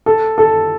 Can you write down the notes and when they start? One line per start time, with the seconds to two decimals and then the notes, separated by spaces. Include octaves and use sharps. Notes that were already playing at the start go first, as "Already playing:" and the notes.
0.06 A4
0.38 A4